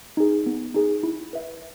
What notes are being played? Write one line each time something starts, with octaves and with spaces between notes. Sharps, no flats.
D#4 G#4
B3
D#4 G#4
E4
B4 E5